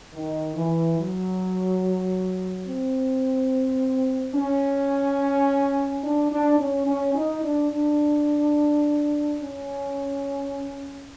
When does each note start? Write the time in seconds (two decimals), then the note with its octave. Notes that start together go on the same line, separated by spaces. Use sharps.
0.14 D#3
0.56 E3
0.99 F#3
2.66 C4
4.35 C#4
6.04 D4
6.31 D4
6.59 C#4
6.87 C#4
7.15 D#4
7.44 D4
7.71 D4
9.40 C#4